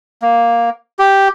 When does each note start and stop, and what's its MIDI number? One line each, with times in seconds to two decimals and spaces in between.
0.22 0.70 58
0.99 1.28 67